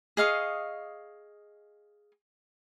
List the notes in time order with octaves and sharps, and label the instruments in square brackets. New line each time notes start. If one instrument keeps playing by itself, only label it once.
[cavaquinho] G#4 D#5 F5 C#6